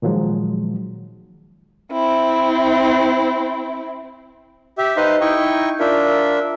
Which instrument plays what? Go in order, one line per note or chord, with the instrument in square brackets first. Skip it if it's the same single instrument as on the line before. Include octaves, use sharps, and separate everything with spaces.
[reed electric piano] A#2 D#3 F3 F#3 G#3
[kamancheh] C4 E4
[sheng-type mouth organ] G4 E5
D#4 B4 C5 D#5 F5
D#4 E4 D#5 G5 C#6
D4 F4 A#4 E5